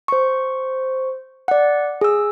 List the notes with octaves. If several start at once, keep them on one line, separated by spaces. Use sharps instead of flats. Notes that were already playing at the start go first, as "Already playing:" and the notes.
C5 C#6
D5 F#5
G#4 E6